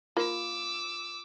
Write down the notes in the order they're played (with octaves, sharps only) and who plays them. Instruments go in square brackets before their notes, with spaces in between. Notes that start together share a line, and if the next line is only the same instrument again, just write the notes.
[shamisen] A#3 [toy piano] F4 [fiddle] D6 E6